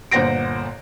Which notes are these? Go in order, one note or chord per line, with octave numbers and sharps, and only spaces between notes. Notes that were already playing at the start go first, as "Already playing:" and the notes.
G1 A#2 C5 F#5 A#6 D7